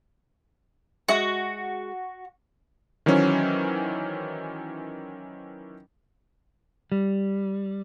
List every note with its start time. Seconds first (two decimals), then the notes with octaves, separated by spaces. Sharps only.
1.08 G#3 F#4 G#4 E5
3.06 D#3 E3 F#3 C#4 C5
6.92 G3